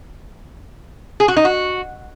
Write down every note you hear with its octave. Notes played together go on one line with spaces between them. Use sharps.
G#4
F#4
D#4
F#4